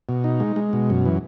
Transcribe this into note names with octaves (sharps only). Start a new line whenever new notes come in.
B2
D#4
G#3
G#3
B2
F#2
E3